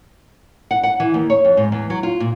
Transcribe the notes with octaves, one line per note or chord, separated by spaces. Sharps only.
F#5
F#5
E3
D#2
C#5
F2
G#2
E2
F#3
F4
A#2